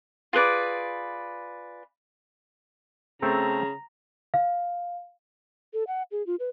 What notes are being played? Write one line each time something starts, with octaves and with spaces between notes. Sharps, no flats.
F4 G#4 B4 D5
C#3 A3 C4 A4 A#5
F5
A4
F#5
G#4
F4
B4